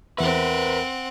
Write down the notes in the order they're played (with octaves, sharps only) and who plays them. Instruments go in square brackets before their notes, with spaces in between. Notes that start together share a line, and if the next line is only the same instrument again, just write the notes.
[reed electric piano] E2 E5 [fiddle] C4 F#5 [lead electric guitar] A#4 B4